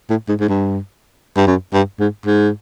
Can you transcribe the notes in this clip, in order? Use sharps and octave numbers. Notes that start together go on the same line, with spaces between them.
A2
G#2
G#2
G2
G2
F#2
G2
G#2
G#2